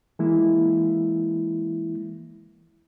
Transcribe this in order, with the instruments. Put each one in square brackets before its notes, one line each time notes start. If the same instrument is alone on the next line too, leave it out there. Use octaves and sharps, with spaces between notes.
[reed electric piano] E3 G#3 A#3 E4